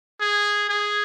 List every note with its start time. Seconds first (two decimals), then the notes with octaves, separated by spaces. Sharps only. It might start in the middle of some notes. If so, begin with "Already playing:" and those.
0.20 G#4
0.69 G#4